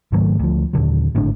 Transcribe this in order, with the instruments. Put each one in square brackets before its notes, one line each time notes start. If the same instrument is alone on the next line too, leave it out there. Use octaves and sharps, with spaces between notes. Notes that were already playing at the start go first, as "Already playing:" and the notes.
[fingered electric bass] G#2 D#3 F#3 A3
D2 F3
D#2 A#2 D3 F#3
G#1 A2 D3 D4